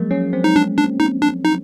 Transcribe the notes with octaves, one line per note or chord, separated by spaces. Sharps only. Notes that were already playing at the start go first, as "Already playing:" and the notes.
Already playing: F3 F#3 G#3 A#3
C#4
C4
D#4
D4
D4
D#4
D4
D#4